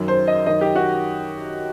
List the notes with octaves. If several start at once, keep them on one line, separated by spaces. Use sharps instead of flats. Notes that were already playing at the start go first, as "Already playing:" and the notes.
Already playing: F#2 D#3
C5
D#5
F#2 D#3 D#5
G4
F#4